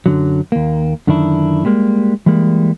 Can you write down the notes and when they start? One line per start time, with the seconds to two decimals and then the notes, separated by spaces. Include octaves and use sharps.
0.06 F#2 D3 F#3
0.52 D#2 A#3
1.07 F#2 D3 D#3 D4 E4
1.65 G3 G#3 A#3
2.26 E3 G3 G#3 A#3